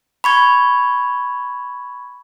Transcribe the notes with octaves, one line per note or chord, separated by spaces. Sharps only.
B5 C#6 G#6